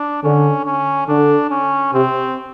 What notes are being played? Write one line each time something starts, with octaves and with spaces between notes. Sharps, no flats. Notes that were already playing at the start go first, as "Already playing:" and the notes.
Already playing: D4
D3 C#4
C#4
D3 D4
C#4
C3 C4